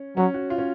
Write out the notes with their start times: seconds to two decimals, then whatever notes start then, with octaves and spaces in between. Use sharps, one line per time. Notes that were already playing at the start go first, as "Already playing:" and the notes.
Already playing: C#4
0.17 F#3 C#4
0.34 F#4
0.50 F4
0.58 C#4